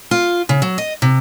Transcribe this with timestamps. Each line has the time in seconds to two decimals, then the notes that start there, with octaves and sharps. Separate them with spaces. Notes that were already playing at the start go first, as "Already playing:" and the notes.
0.11 F4
0.49 C#3
0.62 F#3
0.78 D#5
1.02 C3